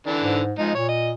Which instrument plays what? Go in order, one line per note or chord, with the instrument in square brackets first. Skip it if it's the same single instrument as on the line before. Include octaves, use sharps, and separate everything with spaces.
[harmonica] D3 E3 D4
[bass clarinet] G#2
[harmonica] F3 D#4 [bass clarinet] G#3
[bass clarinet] A#2 [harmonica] C#5
[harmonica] D#5